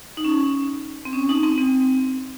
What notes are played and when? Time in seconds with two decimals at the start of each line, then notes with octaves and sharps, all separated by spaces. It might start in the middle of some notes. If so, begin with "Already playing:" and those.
0.17 D#4
0.25 C#4
1.05 C4
1.13 C#4
1.29 D#4
1.43 C4
1.58 C4